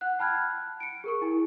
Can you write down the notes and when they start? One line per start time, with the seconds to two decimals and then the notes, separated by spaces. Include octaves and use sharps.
0.01 F#5 F#6
0.19 G5 A5 B5 F6 F#6 G#6
0.80 C#7 D7
1.04 G#4 A#4 C#6
1.22 E4 G#5